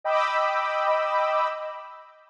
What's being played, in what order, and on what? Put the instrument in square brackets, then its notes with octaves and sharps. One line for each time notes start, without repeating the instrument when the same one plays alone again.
[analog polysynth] D#5 G5 B5 D6 E6